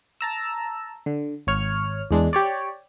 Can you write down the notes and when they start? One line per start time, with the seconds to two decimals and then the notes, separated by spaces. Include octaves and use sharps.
0.21 A5 A#5 E6
1.06 D3
1.47 G#1 C#5 F6
2.11 E2 G#3 D4
2.33 G4 C#5 D5